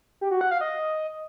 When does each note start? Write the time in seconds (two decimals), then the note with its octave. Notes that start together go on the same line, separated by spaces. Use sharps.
0.21 G4
0.31 F#4
0.41 F#5
0.51 F5
0.61 D#5